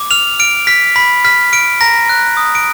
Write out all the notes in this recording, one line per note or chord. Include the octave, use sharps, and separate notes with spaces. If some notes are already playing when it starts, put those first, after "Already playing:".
Already playing: D6
F6 F7
F6 D7
F6 B6
B5 B6
F6 B6
F6 D7
A#5 A#6
F#6
D#6
D7